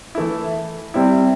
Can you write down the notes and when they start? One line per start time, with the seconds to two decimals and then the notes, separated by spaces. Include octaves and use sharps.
0.15 E3 A3 E4
0.94 C3 G3 C4 E4